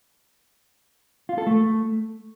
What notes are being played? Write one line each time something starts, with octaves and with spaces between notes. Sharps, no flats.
F4
A4
A3